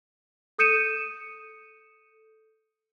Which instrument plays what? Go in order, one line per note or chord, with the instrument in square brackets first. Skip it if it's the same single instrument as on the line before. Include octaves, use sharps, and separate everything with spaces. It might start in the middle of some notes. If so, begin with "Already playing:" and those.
[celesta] A4 D#6 G6 C#7 D#7 E7